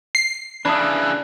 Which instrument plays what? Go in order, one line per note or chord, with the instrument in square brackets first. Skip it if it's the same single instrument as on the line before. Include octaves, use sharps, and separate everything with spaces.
[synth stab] C7
[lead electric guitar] C#3 E3 [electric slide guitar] D4 [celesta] B5 D#6